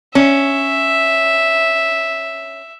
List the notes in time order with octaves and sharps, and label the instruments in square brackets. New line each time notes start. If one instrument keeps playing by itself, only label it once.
[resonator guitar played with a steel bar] C#4 [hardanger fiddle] E5